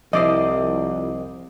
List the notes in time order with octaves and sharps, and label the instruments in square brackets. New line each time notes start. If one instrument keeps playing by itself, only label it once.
[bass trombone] C2 [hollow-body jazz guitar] F3 E4 C5 [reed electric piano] D#5 D6 D#6